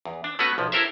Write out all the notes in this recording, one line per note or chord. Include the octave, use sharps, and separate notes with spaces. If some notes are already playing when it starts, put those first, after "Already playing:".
E2
D4
A3 B3 C#4 F#4 B4
B1 F3
E4 G4 A4 A#4 C5 E5